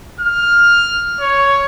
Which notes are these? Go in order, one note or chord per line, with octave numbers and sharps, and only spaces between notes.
F6
C#5